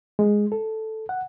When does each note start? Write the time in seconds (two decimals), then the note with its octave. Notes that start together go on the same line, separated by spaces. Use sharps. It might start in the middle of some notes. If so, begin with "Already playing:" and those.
0.19 G#3
0.52 A4
1.09 F#5